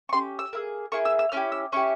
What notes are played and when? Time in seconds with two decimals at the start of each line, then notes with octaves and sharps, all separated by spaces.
0.09 C#6
0.13 C#4 G4 C6
0.39 E6
0.53 A#3 E4 G#4
0.92 A#3 E4 G#4 C#6
1.05 E6
1.19 E6
1.32 C#4 E4 G4 F6
1.52 E6
1.72 C#4 E4 G4 C#6